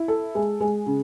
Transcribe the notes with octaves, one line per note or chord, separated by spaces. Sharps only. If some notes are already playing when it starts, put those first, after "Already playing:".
Already playing: E4
A4
G#3
G#3
C#3